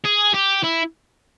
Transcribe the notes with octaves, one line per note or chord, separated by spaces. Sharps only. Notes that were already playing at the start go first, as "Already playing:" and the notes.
G#4
G4
E4